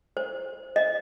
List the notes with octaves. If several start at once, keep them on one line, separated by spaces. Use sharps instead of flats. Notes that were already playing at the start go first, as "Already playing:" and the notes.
C5
D#5